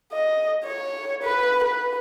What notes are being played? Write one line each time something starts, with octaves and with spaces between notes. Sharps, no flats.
D#5
C#5
B4
B4